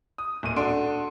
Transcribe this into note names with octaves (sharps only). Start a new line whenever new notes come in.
D#6
D1 A#2 D#7
D4 F#4 A4 C6 D7